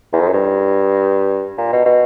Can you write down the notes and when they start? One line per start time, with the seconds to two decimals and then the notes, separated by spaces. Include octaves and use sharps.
0.13 E2
0.20 F2
0.27 F#2
0.33 G2
1.58 A#2
1.72 B2
1.85 B2